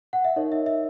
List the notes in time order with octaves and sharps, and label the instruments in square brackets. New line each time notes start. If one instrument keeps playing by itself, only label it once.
[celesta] F#5
E5
D#4 A#4 C#5 D#5
E5
E5